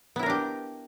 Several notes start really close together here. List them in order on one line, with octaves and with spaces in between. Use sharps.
B3 E4 A#4 D4 G4